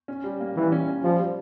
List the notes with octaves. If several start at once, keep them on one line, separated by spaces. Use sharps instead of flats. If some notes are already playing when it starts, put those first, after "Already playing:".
C#4
G3
A#3
E3 G3
C#4
C#4
F3 G3
G3